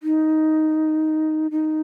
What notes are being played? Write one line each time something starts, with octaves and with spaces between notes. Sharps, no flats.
D#4
D#4